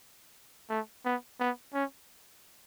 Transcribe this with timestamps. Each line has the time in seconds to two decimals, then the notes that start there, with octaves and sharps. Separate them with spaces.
0.70 A3
1.05 B3
1.40 B3
1.74 C#4